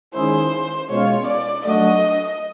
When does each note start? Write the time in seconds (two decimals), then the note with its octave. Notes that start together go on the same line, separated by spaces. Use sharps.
0.13 D#3 G#3 C#4 E4 G#4 C5
0.89 B2 G#3 C#4 F4 C#5
1.27 D5
1.66 F#3 A3 D4 F#4 D#5